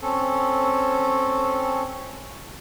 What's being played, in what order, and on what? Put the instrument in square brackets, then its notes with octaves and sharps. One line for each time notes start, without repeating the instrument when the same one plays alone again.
[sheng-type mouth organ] C4 C#4 A4